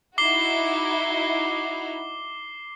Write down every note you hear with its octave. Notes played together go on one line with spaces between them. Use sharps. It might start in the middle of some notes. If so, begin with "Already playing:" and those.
D#4 E4 F#4 D6 C7 G7